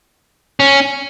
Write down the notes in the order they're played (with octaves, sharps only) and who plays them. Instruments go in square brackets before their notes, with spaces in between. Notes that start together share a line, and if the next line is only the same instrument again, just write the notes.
[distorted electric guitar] C#4